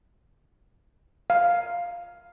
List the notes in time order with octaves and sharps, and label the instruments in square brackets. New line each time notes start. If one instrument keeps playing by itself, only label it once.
[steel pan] F5